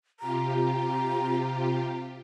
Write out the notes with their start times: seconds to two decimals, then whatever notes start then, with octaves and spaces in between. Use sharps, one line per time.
0.20 C3 F4 G4 A#5